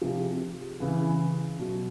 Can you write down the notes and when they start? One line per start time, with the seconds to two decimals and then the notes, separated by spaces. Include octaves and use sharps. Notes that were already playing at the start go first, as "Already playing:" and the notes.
0.01 C3 F3 G#4
0.80 C#3 E3
1.59 B2 F#3